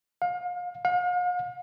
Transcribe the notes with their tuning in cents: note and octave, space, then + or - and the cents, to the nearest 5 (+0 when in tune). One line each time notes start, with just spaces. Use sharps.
F5 +35
F5 +45